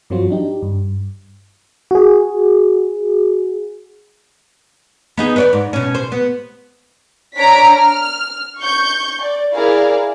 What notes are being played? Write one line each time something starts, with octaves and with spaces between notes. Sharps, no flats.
G2 F3 F#3 C4 F4 F#4
D4 D#4 G4
G2
F#4 G#4
B3 D#4 G#4
B4 C#5 D5
G#2
B2 C#4
C5
B3
D4 C#5 A#5 B6 D7
F6
C#6 G6
D5
E4 G#4 A#4 D5 F5